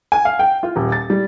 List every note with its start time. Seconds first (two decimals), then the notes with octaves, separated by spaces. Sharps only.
0.12 G#5
0.25 F5
0.39 G5
0.63 F4
0.76 D#1
0.92 A6
1.10 G3